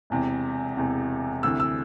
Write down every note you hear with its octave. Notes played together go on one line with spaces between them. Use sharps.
E1 E2 C3
E1 E2 C3
D2 C3 E3 E6
E6